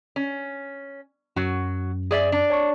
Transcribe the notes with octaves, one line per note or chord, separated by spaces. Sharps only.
C#4
F#2 F#3 F#4
G#4 D5 E5
D4
C#5 A5 C#6